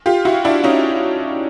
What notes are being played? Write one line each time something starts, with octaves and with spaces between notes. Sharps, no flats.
F4 G4
E4 F#4
D4 E4
C#4 D#4